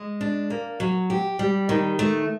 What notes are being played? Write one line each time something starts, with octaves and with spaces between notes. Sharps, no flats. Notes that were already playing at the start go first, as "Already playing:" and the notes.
Already playing: G#3
D4
A#3
F#3
G4
G3
D#3
A3